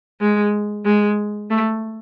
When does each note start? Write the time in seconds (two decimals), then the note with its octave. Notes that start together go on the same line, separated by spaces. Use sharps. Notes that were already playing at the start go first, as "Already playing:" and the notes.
0.21 G#3
0.85 G#3
1.50 A3